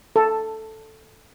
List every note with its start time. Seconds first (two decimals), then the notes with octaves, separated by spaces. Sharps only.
0.16 A4